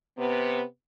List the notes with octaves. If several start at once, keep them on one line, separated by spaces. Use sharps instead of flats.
C3 B3